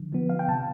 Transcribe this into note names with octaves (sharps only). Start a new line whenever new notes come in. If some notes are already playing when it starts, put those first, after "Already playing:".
Already playing: D3 F3
F3 B3
F5
G5
C3 A5